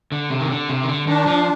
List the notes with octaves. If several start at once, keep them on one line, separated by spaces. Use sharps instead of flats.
D3
C3
D#3
D3
C3
D#3
D3
D#3 D4
F3